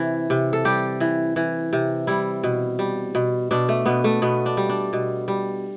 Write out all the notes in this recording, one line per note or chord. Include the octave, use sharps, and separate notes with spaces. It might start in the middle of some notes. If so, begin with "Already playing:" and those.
Already playing: C3 E3
C3
A4
G3 G4
E3
E3
C3
G3 E4
B2
G3
B2
B2 D4
A3
B2 B3
A3
B2 B3
D4
G3
D4
B2
G3